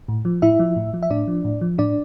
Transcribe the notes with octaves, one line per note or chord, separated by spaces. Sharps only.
A2
F3
A2 E4 E5
F3
A2
F3
E5
A2 D4 D5
F3
A2
F3
A2 D4 D5